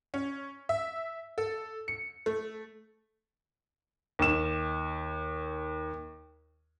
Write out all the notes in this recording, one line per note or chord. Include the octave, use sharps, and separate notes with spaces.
C#4
E5
A4
C#7
A3
D#2 E7